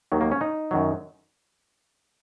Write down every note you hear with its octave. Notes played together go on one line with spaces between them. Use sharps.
D#2 D#3 F#3
A#3
C#4
D#4
F#2 D#3 F#3